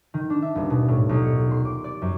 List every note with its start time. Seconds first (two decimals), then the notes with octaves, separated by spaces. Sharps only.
0.14 D#3
0.30 D4
0.42 E5
0.55 D#1
0.70 B2
0.88 A2
1.09 B1
1.23 C#7
1.51 C6
1.65 D6
1.84 D5
2.02 F#2